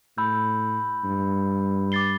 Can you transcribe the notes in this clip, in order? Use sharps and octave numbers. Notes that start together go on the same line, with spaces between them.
A2 B5 E6 G6
G2
D6 A6 C7 G7